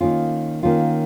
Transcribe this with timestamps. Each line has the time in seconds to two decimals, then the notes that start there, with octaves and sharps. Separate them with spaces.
0.01 D#3 A#3 C#4 F4
0.63 D#3 A#3 C#4 F4